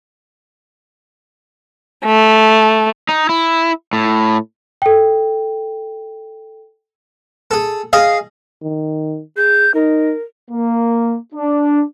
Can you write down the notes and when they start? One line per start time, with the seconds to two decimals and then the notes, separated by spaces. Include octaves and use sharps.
2.05 A3
3.09 D#4
3.29 E4
3.93 A2
4.82 A4 G5
7.51 G#4 A4
7.93 G#4 D#5 F5
8.62 D#3
9.37 G#4 G6
9.74 D#4 A#4
10.51 A#3
11.34 D4